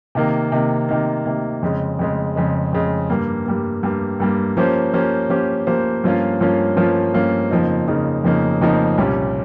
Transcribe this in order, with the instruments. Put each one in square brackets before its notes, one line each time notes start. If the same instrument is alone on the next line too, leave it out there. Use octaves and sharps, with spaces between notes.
[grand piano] C3 D#3 A#3
C3 D#3 A#3
C3 D#3 A#3
C3 D#3 A#3
F2 C#3 G#3
F2 C#3 G#3
F2 C#3 G#3
F2 C#3 G#3
G2 G3 A#3
G2 G3 A#3
G2 G3 A#3
G2 G3 A#3
F3 A#3 C#4 G4 C5
F3 A#3 C#4 G4 C5
F3 A#3 C#4 G4 C5
F3 A#3 C#4 G4 C5
G2 F3 A#3 C#4 F4
G2 F3 A#3 C#4 F4
G2 F3 A#3 C#4 F4
G2 F3 A#3 C#4 F4
F2 C#3 F3 A#3 D#4
F2 C#3 F3 A#3 D#4
F2 C#3 F3 A#3 D#4
F2 C#3 F3 A#3 D#4
C2 A#2 G3 C#4